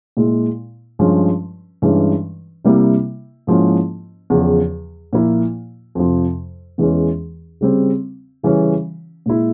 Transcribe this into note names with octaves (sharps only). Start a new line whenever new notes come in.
A#2 G#3 E4
G2 F3 G#3 C#4
G2 E3 G#3 C#4
C3 G3 A#3 E4
G#2 F3 A#3 C#4 E4
E2 C#3 F3
A#2 F3 A#3 E4
F2 C3 F3
E2 E3 G#3 C#4
C#3 G3 C4
C#3 E3 G3 C#4
A#2 G#3 E4